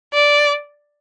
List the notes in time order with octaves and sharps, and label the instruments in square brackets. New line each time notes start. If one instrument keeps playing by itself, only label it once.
[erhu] D5